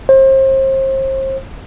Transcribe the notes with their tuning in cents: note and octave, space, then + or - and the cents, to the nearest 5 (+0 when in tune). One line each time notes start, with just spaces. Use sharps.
C5 +35